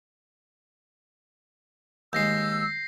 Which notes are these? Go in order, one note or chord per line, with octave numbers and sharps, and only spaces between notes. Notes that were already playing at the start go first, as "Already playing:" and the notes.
D#2 G#3 E6 G6 A#6 C7